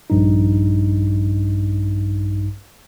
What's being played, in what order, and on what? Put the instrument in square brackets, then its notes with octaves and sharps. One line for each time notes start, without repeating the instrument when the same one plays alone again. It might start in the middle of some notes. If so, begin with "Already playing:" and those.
[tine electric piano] A#1 G2 D#4